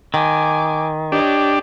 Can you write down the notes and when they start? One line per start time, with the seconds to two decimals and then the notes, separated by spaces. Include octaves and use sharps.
0.14 D#3 G#5 D6
1.12 D4 G4 C#5 D#5